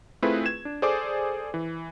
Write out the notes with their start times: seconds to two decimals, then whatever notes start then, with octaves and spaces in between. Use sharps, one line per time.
0.22 A3 C4 E4 F4 G#4 B4
0.46 G#6 E7
0.65 D4
0.82 G#4 A4 C5 D5 G#5 D6
1.54 E3